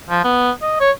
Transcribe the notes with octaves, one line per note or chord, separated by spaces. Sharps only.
F3
B3
D#5
C#5